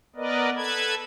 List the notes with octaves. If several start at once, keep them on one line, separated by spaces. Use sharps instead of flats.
B3 A#4 B4 D5 D#5
A4 B4 A5 B5 G#6